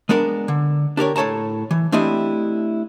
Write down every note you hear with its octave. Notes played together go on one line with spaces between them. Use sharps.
G#3 B3 D4 A#4
D3
D4 G4 A#4 C#5
A2 A4 C#5 A5 A#5
E3
A3 C4 D4 E4 G4 D#5